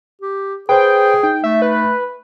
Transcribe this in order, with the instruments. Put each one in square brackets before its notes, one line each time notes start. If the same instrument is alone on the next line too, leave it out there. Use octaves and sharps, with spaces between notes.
[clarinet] G4
[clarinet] G#4 [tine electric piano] B4 C5 [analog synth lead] G5
[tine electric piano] D#4 [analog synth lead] G5
[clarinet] A3 [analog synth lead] E5
[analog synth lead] B4